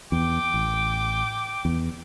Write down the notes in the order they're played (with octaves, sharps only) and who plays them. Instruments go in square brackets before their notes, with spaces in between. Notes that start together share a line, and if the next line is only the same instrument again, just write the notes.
[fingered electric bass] E2 [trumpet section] G5 D6
[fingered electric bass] A1
E2